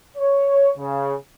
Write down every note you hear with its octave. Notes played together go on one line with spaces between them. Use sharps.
C#5
C#3